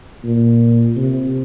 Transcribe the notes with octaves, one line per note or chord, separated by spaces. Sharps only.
A#2
C3